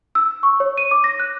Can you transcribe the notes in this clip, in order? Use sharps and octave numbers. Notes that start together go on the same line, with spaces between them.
E6
C#6
C#5
D#7
D6
A#6
F#6